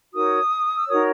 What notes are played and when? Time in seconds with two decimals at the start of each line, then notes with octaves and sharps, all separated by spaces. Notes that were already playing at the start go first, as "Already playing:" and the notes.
0.13 D#4 F#4 A#4 C#5 D#6
0.76 E6
0.87 D#4 F#4 A#4 C#5 D#6